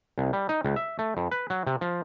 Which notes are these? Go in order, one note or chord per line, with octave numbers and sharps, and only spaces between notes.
C2
G3
D#4
C#2
E5
A3
F2
B4
F#3
C3
F3